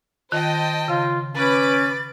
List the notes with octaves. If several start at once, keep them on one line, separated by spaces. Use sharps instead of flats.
D#3 F4 C5 D#5 G5 A5
C#3 F4 F5
C#4 B4 D6 A6